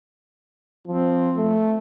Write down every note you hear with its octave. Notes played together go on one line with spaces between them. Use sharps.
F3 C4
A3